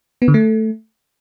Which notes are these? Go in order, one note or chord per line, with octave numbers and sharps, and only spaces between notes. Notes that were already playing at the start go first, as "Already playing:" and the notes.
B3
D3
A3